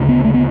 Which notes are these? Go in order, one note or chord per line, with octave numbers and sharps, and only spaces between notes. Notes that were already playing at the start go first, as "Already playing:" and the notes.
Already playing: D2 C#3
B3
A3
B3